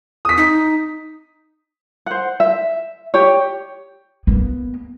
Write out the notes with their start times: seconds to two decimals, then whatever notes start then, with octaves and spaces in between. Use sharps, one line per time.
0.25 D#6 B6
0.37 D#4
2.06 C5 F#5
2.40 E5
3.14 G4 C#5
4.27 A#3 B3